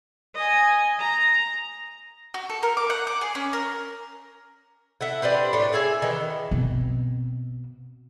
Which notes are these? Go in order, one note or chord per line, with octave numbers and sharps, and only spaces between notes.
D#5 G#5
A#5
F#4
A4
A#4
D6
F#5
D6
G#4
C#4
A#4
E4 A4 F#5
D4 G4 B4 C5
A2 D4
A2 G#4 E5 G#5
D#3 E3 B3
B2 C4